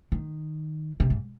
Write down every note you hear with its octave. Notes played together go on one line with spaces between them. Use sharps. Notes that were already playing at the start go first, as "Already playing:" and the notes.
D#3
C3
G#2